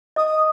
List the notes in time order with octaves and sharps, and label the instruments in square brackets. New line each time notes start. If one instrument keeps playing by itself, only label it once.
[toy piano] D#5 [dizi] D#6